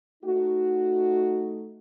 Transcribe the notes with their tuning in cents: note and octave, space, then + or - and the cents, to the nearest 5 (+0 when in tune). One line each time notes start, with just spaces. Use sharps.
A3 +0 D#4 +0 F#4 +0